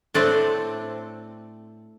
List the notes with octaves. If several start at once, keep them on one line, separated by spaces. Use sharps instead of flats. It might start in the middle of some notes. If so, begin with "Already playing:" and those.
A2 A3 C4 D4 D5